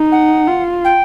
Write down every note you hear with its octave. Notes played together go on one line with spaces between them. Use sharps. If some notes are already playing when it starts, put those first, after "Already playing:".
Already playing: D#4
F#5
F4
G5